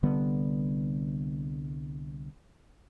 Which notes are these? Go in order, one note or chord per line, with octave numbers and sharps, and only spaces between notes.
C2 D3 G3 B3